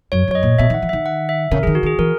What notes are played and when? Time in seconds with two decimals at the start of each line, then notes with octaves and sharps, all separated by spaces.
0.12 F#2 C#5
0.28 F#2 C#5
0.35 D#5
0.43 A#2
0.58 B2 E5
0.70 D#3 F#5
0.82 E3
0.89 E5
0.93 D#3
1.06 F#5
1.29 E5
1.51 C#3 A#4
1.63 E3 G#4
1.67 D#3
1.75 F#4
1.83 D#3 G#4
1.99 E3 A#4